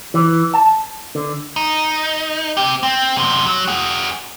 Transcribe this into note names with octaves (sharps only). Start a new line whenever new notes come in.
E3
A5
D3
D#4
C4 G4
C4
F#2 C3
F#3
F#4 G#4